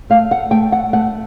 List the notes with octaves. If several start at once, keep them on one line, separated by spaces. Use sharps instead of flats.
A3 F5
F#5
A3 G5
F#5
A3 F#5